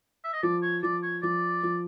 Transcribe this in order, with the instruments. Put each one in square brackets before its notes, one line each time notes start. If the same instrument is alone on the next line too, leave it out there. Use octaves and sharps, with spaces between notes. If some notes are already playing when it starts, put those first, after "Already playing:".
[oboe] E5
D#5
[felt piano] F3 [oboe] D5
[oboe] C#5
[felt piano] F3 [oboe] D5
[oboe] C#5
[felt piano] F3 [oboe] D5
[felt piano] F3